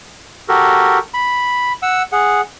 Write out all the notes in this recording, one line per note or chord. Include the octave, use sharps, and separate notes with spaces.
F#4 G4 A4 A#4
B5
F#5 E6
G#4 F#5